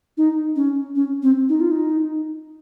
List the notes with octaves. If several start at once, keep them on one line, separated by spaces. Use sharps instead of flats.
D#4
C#4
C#4
C4
D#4
F4
D#4